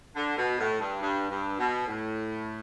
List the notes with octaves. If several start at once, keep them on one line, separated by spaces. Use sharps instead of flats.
D3
B2
A2
G2
G2
G2
B2
A2